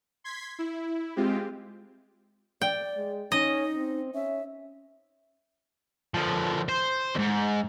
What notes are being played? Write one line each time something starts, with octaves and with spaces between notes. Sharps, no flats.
C6 G#6 B6
E4
G#3 C4 F4 G4
D5 G5
G#3
C#4 D#4 D#5
C4
C#4 E5
D3 F3
C5
E2 G#2